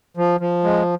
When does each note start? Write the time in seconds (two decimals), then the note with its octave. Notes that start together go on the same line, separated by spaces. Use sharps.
0.17 F3
0.40 F3
0.64 G#3